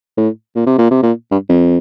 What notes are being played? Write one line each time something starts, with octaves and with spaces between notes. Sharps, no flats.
A2
A#2
C3
A#2
C3
A#2
G2
F2